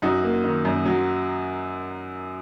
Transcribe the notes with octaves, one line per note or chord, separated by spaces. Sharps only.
F#2 D#4 F#4
A#3
D#3
F#2
F#3